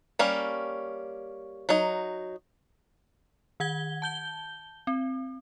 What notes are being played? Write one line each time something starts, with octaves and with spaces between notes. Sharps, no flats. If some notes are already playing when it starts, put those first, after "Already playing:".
G3 A#3 C#4
F#3 D#4
D#3 F#5 G#6 G7
A5 G6 G7
C4